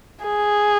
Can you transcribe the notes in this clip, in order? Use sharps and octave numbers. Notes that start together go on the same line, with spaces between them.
G#4